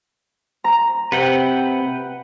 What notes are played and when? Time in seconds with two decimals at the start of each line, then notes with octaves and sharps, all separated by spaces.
0.64 A#5
1.12 C3 B4 F#5 G5